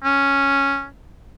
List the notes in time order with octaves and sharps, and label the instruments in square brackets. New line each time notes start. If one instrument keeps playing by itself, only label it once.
[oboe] C#4